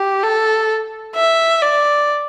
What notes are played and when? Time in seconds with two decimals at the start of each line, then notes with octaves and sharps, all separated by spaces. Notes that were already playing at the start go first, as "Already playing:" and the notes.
Already playing: G4
0.23 A4
1.15 E5
1.62 D5